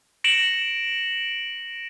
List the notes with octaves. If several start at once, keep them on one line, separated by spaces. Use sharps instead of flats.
A#6 C#7 D7 E7 F#7